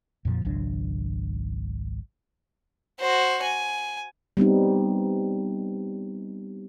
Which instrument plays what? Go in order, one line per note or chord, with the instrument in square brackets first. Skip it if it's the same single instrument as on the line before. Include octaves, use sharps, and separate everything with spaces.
[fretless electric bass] F2 A#2 F3
G#1 C#2 F#3 D4
[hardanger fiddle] F#4 C5
G#5
[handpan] G3 B3 C4 D#4